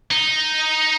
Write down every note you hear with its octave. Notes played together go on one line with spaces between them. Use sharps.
D#4